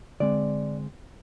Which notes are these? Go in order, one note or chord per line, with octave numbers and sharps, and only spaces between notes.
D3 G#3 C4 D5